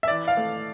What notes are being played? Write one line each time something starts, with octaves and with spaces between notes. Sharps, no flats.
E5
E3 D5
F5
A3